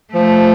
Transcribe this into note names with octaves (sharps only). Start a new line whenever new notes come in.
F3 A3